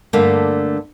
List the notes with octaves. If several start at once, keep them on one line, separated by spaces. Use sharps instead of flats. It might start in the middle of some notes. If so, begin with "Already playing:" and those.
G2 D3 A3 A#3